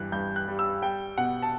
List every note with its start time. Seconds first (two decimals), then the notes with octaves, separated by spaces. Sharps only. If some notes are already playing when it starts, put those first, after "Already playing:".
Already playing: G2 E3 F#6
0.12 G2 G6
0.36 F#6
0.48 G3
0.59 E6
0.82 G3 G5
1.18 B2 F#5
1.42 A5